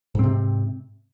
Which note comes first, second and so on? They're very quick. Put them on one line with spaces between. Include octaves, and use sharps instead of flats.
G#2 C4 C3